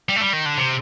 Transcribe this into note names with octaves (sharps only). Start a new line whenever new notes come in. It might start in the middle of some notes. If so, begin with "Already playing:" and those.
G3
A3
G3
D#3
D3
C3